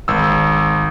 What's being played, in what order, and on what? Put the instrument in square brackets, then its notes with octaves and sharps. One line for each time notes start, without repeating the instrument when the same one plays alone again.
[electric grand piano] G#1 E6